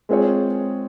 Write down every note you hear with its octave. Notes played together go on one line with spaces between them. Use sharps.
G#3 C4 F4 G#4 C#5